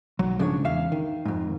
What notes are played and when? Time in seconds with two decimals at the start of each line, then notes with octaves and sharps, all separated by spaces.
0.19 B1 F#3
0.39 G#2 C#3 F3 D4 C#5
0.65 E2 E5 F5
0.92 D#3
1.25 F2 G#2